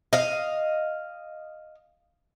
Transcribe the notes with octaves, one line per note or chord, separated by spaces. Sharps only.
D#5 F5